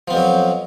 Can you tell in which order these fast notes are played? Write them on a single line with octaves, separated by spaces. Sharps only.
F3 B3 F2 F#3